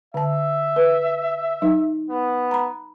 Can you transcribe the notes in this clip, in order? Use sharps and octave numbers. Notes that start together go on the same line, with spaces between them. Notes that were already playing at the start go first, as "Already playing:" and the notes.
D3 E5 A5
B4
F#3 D#4
B3
A#5 B5